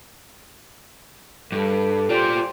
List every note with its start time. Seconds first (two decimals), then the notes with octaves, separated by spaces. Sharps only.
1.52 G2 A4
2.09 F4 G4 C5 D5